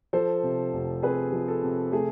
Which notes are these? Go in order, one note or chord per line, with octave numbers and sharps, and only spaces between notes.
F3 A4 C5
C3
F1
F2 G#4 B4
F3
A4
C3
A3 G#4